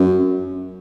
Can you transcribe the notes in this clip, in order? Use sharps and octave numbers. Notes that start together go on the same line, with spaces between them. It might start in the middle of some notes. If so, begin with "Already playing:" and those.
Already playing: F#2